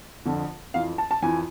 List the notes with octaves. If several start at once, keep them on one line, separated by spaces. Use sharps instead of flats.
F2 D3 F3
F2 E3 F5
A5
A5
F2 E3 G#5